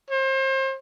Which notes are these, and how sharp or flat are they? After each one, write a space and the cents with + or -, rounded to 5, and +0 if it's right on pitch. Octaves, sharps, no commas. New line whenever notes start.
C5 +35